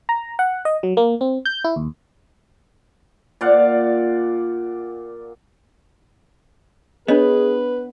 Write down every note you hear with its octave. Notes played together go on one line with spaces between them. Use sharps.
A#5
F#5
D#5
F#3
A#3
C4
G6
E4
D#2
A#2 D5 F5 F#5
B3 D4 G#4 B4 C#5 D#5